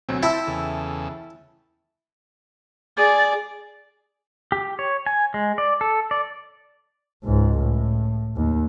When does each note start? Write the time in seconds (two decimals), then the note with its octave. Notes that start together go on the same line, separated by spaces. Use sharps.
0.09 D2 B2 F#3 C4 E5 G#5
0.23 E4 C5 G5 A5 E6
0.47 E2 C#3 A4
2.97 G#4 D5 A6
4.52 G4
4.79 C#5
5.06 G#5
5.34 G#3
5.58 D5
5.81 A4
6.11 D5
7.24 C#2 G#2
7.59 A2
8.36 D#2